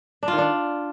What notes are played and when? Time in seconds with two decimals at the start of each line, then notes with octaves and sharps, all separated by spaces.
0.23 D4
0.28 F4
0.33 D#3
0.38 D4